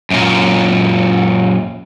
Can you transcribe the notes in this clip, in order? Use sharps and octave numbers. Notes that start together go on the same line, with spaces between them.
F#2 A#2